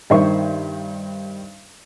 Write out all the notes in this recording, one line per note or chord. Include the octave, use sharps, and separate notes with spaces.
G2 D#3 C5 E5 C#6